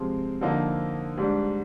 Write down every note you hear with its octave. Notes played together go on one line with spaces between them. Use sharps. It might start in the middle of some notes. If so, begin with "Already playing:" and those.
Already playing: C3 F3 G#3 C4
D3 F3 A#3 D#4
G#2 G3 D4